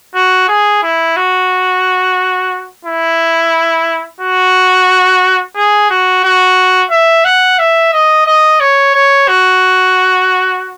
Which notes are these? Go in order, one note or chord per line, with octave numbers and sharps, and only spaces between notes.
F#4
G#4
E4
F#4
E4
F#4
G#4
F#4
F#4
E5
F#5
E5
D#5
D#5
C#5
C#5
F#4